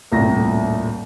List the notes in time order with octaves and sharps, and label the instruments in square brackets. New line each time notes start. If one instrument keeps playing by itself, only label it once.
[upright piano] D#1 C2 A2 A#5 A#6